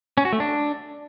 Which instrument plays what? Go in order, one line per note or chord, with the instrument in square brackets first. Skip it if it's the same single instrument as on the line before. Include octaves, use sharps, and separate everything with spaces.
[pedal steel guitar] C#4
F#4
A3
D4